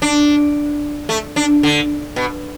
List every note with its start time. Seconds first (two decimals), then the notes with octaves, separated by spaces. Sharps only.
0.02 D4
1.09 A3
1.36 D4
1.63 D3
2.16 B2